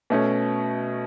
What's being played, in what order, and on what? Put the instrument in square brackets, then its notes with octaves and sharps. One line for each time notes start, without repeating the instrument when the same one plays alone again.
[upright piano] B2 A3 C#4